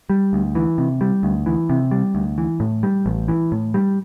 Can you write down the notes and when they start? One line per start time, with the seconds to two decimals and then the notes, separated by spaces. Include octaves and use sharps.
0.10 G3
0.33 D2
0.55 E3
0.78 C3
1.01 G3
1.23 D2
1.46 E3
1.70 C3
1.91 G3
2.15 D2
2.38 E3
2.60 A2
2.83 G3
3.06 A1
3.28 E3
3.52 A2
3.74 G3